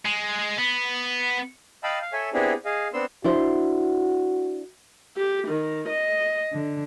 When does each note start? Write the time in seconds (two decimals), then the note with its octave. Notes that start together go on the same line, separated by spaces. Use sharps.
0.05 G#3
0.58 B3
1.84 D#5 F5 G5 A5 B5 E6
2.01 F5
2.13 A4 C#5 E5 G#5
2.34 B3 C4 D4 E4 G4 G#4
2.65 G#4 D#5 F5
2.93 B3 C4 D4 C6 E6
3.24 D4 E4 F#4 C5
5.17 G4
5.47 D#3
5.88 D#5
6.52 D3